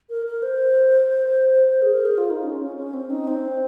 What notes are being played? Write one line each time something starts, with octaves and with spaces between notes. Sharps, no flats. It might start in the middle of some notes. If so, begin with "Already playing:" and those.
A#4
A#4
C5
G#4
A#4
G#4
F4
D#4
C#4
C#4
C#4
C4
D#4
C4